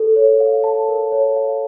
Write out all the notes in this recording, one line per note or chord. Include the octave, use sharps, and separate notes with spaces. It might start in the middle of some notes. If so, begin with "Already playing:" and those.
Already playing: A4
C#5
F5
A5
A#4
C#5
F5